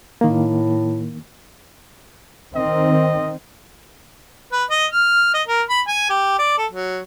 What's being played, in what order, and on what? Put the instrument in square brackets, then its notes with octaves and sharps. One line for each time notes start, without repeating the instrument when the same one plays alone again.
[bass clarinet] A2 [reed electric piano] D#3 A#3
[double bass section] D#3 C4 [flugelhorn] D#5
[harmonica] B4
D#5
F6
D#5
A#4
B5
G#5
G4
D5
A4
F#3